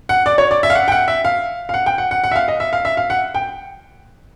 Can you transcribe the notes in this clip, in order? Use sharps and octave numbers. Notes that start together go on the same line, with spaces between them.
F#5
D5
C#5
D5
E5
F5
F#5
G5
F#5
E5
F5
F5
F#5
G5
F#5
F#5
F#5
E5
F5
D#5
E5
F5
E5
F5
F#5
G5